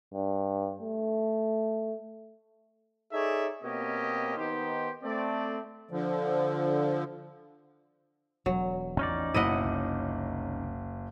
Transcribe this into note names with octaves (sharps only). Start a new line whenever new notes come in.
G2
A3
D#4 G#4 A4 C#5 D5 E5
B2 A#3 C4 C#4 G4 D#5
D#3 B3 D#4 G4 C5
A3 C4 D5
D3 F3
E1 F#3
A1 E2 F3 C#4 D#4 D5
F#1 B2 E4 D#5 F#5 D#7
C2